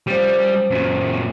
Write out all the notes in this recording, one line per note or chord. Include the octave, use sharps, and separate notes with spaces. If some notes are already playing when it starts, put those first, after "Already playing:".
F3 G3 C#4
F#2 A#2